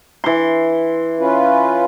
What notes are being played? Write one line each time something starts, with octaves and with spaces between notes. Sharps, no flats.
E3 C6
C#4 F4 B4